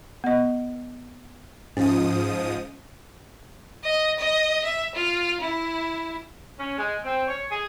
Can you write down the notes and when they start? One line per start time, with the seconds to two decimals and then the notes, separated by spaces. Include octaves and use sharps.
0.24 B3 D#5
1.77 G#2 F3 C#4 D#6
3.84 D#5
4.19 D#5
4.64 E5
4.95 F4
5.41 E4
6.59 C#4
6.78 G#3
7.04 C4
7.28 C#5
7.51 G#4